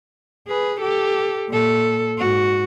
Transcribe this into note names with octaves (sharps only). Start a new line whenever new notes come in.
G#4 B4
G4 A4
A#2 A4
G#2 F#4